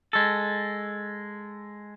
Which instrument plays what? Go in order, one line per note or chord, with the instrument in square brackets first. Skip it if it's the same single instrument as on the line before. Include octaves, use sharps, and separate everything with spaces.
[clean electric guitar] G#3 A4